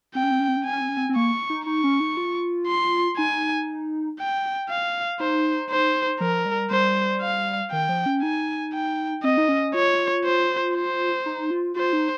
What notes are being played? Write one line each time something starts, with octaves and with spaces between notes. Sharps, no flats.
C4 G5
C#4
C4
C#4
C4
C#4
C4 G#5
C#4
C4
C#4
C4
C4
A#3 C#6
D#4
D#4 C#6
C#4
D#4
F4
C6
D#4 G#5
G5
F5
D#4 C5
C5
F3 A#4
G3
G3 C5
F5
D#3 G5
F3
C#4
D#4 G#5
G5
C4 D#5
D#4
C#4
F4 C#5
C5
C5
D#4
F4
F4 C5
D#4